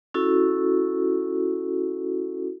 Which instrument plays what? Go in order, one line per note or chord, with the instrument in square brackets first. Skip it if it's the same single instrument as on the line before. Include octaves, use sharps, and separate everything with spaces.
[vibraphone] C#4 E4 F#4 A4